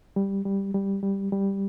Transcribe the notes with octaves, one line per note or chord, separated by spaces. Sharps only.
G3
G3
G3
G3
G3